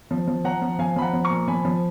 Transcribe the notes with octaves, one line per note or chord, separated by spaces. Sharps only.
F3
F3
F3 F#5 A#5
F3
F3 F5 G#5
F3 B5
F#5 A#5
F3
A#5 C#6
A#2
F3 G#5 B5
F3